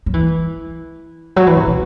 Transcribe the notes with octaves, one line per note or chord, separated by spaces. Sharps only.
F#3
E3
F#3
E3
C3
B2